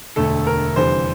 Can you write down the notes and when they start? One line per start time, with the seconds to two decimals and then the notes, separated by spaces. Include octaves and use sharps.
0.16 E1 D2 D3 A3 A4
0.47 A#4
0.76 F1 E2 D3 G3 C5